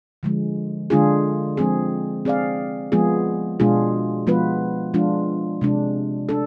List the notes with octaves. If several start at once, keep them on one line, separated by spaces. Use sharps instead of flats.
D3 F3 G#3
D3 G#3 D4 F4 G#4
F3 G#3 C4 G#4
C4 G#4 D5 F5
F3 G#3 B3 F4 G#4
B2 G#3 D4 F4 G#4
F3 G#3 B3 F4 B4
F3 G#3 D4 F4
C3 G#3 D4
D4 A4